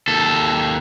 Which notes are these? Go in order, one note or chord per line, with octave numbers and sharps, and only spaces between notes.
D#2 A4